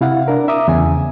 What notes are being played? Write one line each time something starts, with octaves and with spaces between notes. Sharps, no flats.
C3 E4 F5 F#5
D4 A#4
E5 A#5 D6 D#6
E2 C#3 G#5